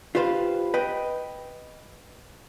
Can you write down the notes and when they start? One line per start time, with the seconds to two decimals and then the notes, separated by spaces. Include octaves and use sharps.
0.15 F4 G4 B4 C5 F5
0.74 B4 D#5 G5